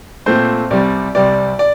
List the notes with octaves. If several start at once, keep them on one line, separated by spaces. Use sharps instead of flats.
A#2 A3 C4 C5
C2 C3 G3 D5
C2 C3 G3 D5
D5